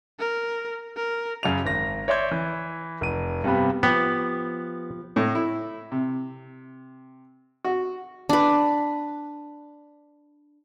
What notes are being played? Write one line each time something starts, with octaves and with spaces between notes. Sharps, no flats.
A#4
A#4
F#2 C#3 F7
G#1 A#6
C#5 D5 E5 C6 G6 G#6
E3
F1 D#7
G2 C3 G3 B3 B5
F3 B3 G4
A2
E4
C3
F#4
D4 B4